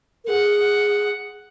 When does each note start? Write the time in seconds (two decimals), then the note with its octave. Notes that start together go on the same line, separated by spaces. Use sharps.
0.24 A#4
0.29 G#4 F#5